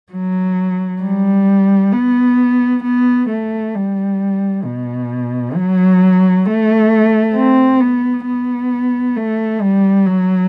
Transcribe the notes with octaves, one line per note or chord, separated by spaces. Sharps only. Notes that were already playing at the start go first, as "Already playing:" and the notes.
F#3
G3
B3
B3
A3
G3
B2
F#3
A3
C4
B3
B3
A3
G3
F#3